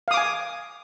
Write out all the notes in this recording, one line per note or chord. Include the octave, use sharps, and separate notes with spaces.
F5 G#5 D6 D#6